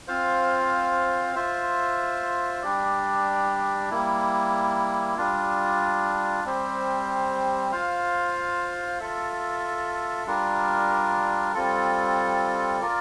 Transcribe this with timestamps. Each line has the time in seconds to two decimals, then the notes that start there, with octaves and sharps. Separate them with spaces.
0.08 C4 F4 C5 F5
1.35 F4 C5 E5
2.62 G3 D4 G4 D5
3.90 G3 A#3 E4
5.17 G3 D4 F4
6.44 G3 C4 G4 C5
7.72 F4 C5 F5
9.00 F4 A4 E5
10.26 G3 D4 F4 A#4
11.54 G3 C4 F4 A4
12.81 F4 A#4 D5